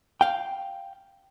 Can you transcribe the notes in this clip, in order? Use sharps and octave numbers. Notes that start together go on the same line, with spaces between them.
F5 G5